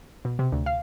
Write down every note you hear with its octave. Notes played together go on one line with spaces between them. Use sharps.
B2
C3
D2
F5